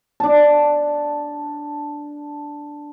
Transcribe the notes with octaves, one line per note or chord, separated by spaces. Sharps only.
D4 A5